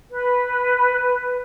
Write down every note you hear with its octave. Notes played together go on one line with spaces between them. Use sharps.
B4